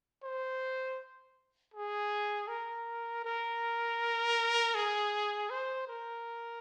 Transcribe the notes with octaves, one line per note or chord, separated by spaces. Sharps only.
C5
G#4
A#4
A#4
G#4
C5
A#4